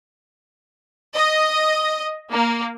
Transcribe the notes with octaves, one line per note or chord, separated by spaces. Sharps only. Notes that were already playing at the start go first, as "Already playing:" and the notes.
D#5
A#3